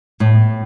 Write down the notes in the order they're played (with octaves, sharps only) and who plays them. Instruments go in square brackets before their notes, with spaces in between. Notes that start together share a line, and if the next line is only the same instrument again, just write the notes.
[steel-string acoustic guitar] A2